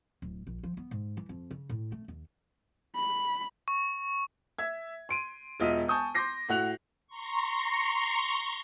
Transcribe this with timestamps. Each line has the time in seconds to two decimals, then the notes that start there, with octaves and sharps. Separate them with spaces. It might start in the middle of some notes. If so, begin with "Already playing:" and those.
0.22 D1
0.47 A#1
0.63 F3
0.77 B3
0.91 G#2
1.17 E3
1.29 F2
1.51 C#3
1.69 A2
1.92 A3
2.08 D#2
2.96 B5
3.68 C#6
4.59 E5 G#6
5.09 C6 D7 D#7
5.60 E1 F4 D#5 E5 D#7
5.88 G#5 A5 C#6 D#6 G6
6.15 C6 D6 G6 A#6 C7
6.49 A2 F#4 F#6 F7
7.07 A#5 C6 C#6